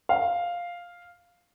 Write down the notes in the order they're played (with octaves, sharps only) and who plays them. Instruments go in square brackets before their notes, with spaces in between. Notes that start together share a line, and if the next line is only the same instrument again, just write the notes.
[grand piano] F5